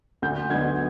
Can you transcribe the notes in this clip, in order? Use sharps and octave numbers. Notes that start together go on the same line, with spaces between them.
D2 G6
D3 F#3 B3 D#4 G#6